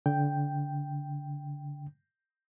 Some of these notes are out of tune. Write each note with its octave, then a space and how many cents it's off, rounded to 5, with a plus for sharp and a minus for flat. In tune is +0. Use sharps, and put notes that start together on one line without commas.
D3 -25 G5 +0